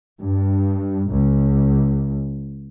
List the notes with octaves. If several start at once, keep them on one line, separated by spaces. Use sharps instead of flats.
G2
C#2